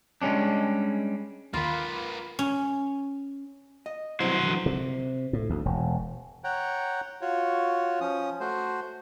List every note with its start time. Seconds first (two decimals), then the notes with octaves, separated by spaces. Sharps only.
0.22 G3 G#3 C#4 D4
1.54 D#2 D#3 A#3 F4 B4 B5
2.39 C#4
3.86 D#5
4.20 G2 C3 F#3 E4 C5
4.42 D3 E3
4.66 C3
5.33 A2
5.50 D2
5.65 E1
6.44 C#5 F#5 G5 A#5
7.21 F4 F#4 C#5
8.01 F3 C#4 D#6
8.40 A3 F#4 C5